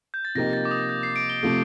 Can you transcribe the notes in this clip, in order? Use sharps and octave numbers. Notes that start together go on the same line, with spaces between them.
G6
A6
C3 F3 A#3 D#4 G4 A#6
A6
D6
D#6
G6
C7
D7
G7
C3 F3 A3